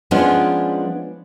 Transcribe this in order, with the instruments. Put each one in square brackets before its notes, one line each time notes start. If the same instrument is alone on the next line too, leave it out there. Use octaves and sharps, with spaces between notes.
[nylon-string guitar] F3 G#3 B3 C#4 D4 F4